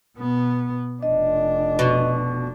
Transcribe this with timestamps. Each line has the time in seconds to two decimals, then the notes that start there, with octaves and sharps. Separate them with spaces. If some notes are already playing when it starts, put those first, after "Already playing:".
0.17 B2 B3
1.03 F1 D4 D#5
1.79 B2